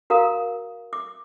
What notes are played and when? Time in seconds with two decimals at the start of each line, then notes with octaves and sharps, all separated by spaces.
0.10 F#4 A#4 F5 A#5 D#6
0.93 D6